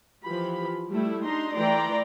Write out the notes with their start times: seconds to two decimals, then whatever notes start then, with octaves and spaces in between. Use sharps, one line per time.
0.24 E3 F3 F4 G4 B5
0.89 G3 A3 E4
1.23 D4 D#4 A#5 C6
1.56 E3 A3 D5 G5 A#5 C6